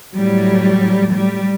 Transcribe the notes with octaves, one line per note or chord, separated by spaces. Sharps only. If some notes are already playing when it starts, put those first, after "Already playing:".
A2 F#3 G3
G3